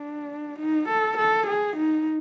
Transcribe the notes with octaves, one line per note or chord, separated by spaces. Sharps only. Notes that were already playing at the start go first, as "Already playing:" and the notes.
Already playing: D4
D#4
A4
A4
G#4
D#4